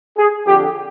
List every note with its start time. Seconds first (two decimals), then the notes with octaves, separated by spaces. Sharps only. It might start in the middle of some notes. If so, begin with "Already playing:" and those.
0.17 G#4
0.45 F2 D3 G4